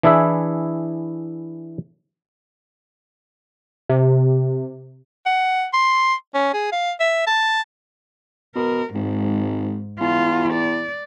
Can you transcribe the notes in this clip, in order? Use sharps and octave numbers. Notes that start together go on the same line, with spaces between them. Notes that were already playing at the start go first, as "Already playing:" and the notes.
E3 D4 E4 G#4 E5
C3
F#5
C6
C#4
G#4
F5
E5
A5
B2 A#4
G#1 G#2
E2 F4
D5